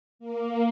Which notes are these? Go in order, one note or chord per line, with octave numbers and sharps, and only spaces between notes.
A#3